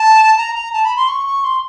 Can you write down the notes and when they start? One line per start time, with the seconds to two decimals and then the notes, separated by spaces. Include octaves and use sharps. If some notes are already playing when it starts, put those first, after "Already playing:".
Already playing: A5
0.38 A#5
0.56 A#5
0.73 A5
0.85 B5
0.97 C6
1.09 C#6
1.27 C#6
1.44 C6